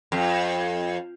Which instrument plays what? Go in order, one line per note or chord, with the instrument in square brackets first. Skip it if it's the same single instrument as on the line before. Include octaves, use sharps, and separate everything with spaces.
[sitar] F2